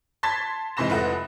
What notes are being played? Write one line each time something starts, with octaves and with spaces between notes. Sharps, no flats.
A5 C6 G#6 A6 B6
G#2 C3 E3 C6 A#6 E7
F1 F3 E4 B4 F#5